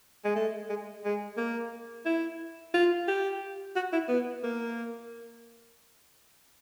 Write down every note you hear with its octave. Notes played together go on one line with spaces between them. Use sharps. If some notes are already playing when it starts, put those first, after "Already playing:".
G#3
A3
G#3
G#3
A#3
E4
F4
G4
F#4
E4
B3
A#3